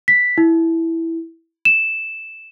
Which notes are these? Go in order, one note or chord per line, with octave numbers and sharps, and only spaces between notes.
B6
E4
E7